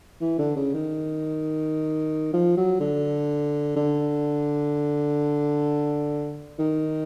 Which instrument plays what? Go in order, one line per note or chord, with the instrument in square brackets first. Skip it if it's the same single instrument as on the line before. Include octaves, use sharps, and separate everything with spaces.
[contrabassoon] E3
D3
C#3
D#3
F3
F#3
D3
D3
D#3